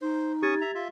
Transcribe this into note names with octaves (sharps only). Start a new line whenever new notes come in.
D#4 C5
C#4 G4 C#6 D#6 G#6 A6
E5 A#5
F4 E5